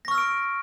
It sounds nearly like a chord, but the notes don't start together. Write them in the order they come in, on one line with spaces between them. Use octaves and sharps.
A#6 C#6 F6 E6 D7